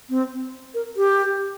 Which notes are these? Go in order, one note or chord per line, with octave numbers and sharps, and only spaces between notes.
C4
A#4
G4